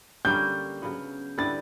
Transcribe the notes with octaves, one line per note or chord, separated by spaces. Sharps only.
D3 G3 A#3 C#4 G6
C#3 F#3 B3
D3 G3 B3 E4 A6